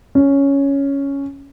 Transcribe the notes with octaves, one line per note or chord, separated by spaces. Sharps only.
C#4